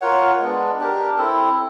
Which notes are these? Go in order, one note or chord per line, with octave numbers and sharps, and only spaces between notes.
F4 A#4 C#5 F#5
G#3 B3 D4
D4 G4 A#4
C4 E4 A4